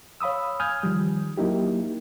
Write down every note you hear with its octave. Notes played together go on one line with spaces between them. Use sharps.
C#5 F5 B5 D#6 E6
G#5 D#6 F6 G6 G#6
D#3 F3 G3
F#3 A#3 D#4 E4 G4